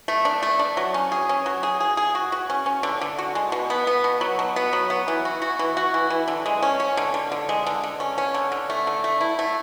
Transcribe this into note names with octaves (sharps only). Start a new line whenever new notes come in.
A3
D4
A3
D4
F#3
C#4
G#4
C#4
F#3
G#4
G#4
G#4
F#4
F#4
C#4
C#4
D3
D3
F#4
G#3
B2
B3
B3
B2
F#3
B2
B3
F#3
B3
E3
F#4
F#4
E3
F#4
E3
E3
D3
G#3
C#4
C#4
D3
D3
D3
G#3
D3
D3
C#4
C#4
D3
D3
A3
D3
A3
E4
A3